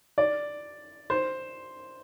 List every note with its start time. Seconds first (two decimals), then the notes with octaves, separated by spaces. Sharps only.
0.18 D5
1.10 C5